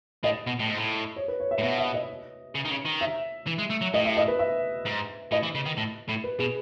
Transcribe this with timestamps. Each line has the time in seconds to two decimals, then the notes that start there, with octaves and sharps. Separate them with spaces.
0.24 A2 D#5
0.47 B2
0.59 A2
0.68 G#2
0.77 A2
1.16 C#5
1.28 B4
1.40 C#5
1.51 E5
1.58 A2
1.63 B2 E5
1.78 E5
1.94 D#5
2.55 C#3
2.65 D#3
2.70 C#3
2.85 D#3
3.01 E5
3.47 E3
3.58 G#3
3.70 A3
3.81 F#3
3.94 A2 D#5
4.05 E5
4.17 D#5
4.28 B4
4.39 E5
4.85 G#2
5.32 A2 D#5
5.43 E3
5.55 C#3
5.66 D#3
5.77 A2
6.09 A2
6.24 B4
6.39 B2 G#4